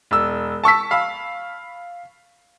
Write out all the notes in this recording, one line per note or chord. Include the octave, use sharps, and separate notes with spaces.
E1 E6
A5 C#6 E6 B6
F5 B5 E6